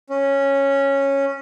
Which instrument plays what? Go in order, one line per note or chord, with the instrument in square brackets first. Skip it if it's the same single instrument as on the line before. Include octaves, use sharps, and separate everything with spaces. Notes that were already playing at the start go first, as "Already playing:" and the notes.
[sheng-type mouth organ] C#4